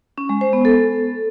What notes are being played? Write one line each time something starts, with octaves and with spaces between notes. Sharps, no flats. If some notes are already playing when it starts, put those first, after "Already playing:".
C#4
G#3
C5
B3
A4